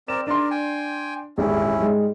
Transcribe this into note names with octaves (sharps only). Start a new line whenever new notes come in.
C4 A#4 D5 E7
D4 A#4 D5 C6
G5 G#5
D#1 G#1 E2 C#4 E4
G#2 G3 G#3